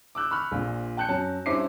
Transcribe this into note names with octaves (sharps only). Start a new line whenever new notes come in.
D6 E6 F#6 G6
B5 C#6 F6 F#6
A#1 A#2
G5 A5 F#6 G6 C#7
F#2 F#3 A5
G2 C#4 E4 C5 D6 C7